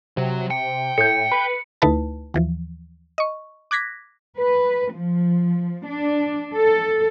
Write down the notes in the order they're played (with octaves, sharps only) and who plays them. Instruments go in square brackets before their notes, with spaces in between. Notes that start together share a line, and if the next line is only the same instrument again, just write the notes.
[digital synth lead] C3 [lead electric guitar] F#3 F#4
[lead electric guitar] G5 [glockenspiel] C#7
[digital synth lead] A2 [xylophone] A4 G6 [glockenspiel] C#7
[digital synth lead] B4 [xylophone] B5
[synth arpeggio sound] D2 A3 D#4 E4 B4 A5
D#2 E3 F3
D#5 C#6
D6 F#6 G#6 A#6 B6
[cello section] B4
F3
D4
A4